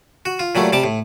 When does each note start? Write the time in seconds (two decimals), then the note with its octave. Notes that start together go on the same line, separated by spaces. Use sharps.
0.25 F#4
0.39 F4
0.55 A#2 F#3 G3 A3
0.72 C3 G3 A5 D6
0.84 A2